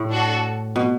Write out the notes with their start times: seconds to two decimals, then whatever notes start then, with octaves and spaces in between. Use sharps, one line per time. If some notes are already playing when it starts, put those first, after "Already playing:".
Already playing: A2
0.10 D4 F#4 A4
0.76 B2